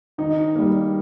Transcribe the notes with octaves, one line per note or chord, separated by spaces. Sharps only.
D#3 D#4
G3 A#3